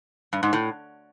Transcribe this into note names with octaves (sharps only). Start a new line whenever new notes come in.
G2
G#2
A2